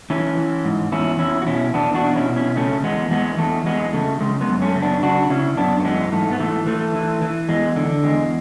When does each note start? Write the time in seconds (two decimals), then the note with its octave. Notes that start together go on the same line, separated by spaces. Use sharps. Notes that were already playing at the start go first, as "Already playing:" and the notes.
0.10 E3 C#4 E4
0.38 E3
0.65 G#2
0.92 E2 C#4 E4
1.19 E2 C#4 E4
1.42 F#4
1.47 B2 C#4 E4
1.74 E2 B3 D4
1.94 D4 F#4
2.02 B2
2.15 C#4 E4
2.29 B2
2.36 C#4 E4
2.56 C#3 A3 C#4
2.83 E2 G#3 B3
3.11 E2 G#3 B3
3.39 E2 A3
3.66 E2 G#3 B3
3.93 C#3 A3
4.21 C#3 G#3
4.41 G#3 B3
4.48 F#2
4.62 A3 C#4
4.75 C#3
4.82 B3 D4
5.03 C#3 D4 F#4
5.30 C#3 C#4 E4
5.57 F#2 B3 D4
5.80 A3
5.85 E3 G#3 B3
6.12 G#2 A3
6.32 B3
6.40 E3 A3
6.67 E3 A3
6.95 E3
7.22 E3
7.49 E2 G#3
7.76 D3
8.04 E2 G#3